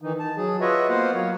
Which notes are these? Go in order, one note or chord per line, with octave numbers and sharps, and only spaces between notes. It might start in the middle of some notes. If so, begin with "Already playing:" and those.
D#3 E3 D#4
A5
F#3 G#4
F4 F#4 B4 C#5 D#5 E5
A#3 B3 F4 C5 F5 F#5
F#3 C#5